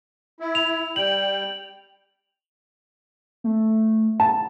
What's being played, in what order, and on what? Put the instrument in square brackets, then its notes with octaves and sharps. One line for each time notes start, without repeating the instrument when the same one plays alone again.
[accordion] E4
[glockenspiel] F7
[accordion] G3 G5 [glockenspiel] F#7
[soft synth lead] A3
[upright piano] A5